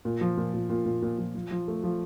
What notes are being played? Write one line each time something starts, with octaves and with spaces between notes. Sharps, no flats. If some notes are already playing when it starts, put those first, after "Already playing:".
A#2
F3
A#2
A#2
A#2
A#2
A#2
F3
F3
F3
A3
F3